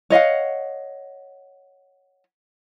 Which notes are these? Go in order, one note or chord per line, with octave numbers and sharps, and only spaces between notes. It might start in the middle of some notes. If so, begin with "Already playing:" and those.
C#5 D#5 F5 F#5